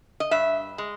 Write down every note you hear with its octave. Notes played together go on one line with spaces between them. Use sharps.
D#5
G2 E5
G#3